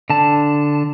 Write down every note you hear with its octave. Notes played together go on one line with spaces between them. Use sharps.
D3 A5